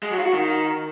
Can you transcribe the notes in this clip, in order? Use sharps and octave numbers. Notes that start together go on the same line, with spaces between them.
G#3
F#3
F4
F#4
D#3